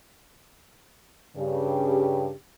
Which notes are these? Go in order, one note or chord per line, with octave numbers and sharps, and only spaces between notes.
G2 C#3 G4